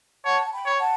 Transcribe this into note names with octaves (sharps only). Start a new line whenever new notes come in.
C#5 F#5 A5
A5
G5 B5
C#5
F#5 A5